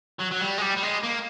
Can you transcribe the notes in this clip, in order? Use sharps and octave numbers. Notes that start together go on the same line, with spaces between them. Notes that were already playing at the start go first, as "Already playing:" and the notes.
F#3
F#3
G3
G#3
G3
G3
G#3
A#3